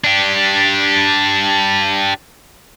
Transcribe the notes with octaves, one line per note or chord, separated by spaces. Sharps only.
D4 G4